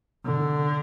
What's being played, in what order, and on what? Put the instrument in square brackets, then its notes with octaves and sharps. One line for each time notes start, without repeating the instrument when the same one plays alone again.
[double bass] D3